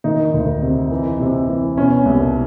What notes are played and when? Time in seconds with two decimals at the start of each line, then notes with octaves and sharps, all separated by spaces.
0.04 D#3 D#4
0.34 D2
0.62 C3
0.91 E3
1.20 C3
1.48 E3
1.77 B2 C#4
2.06 C2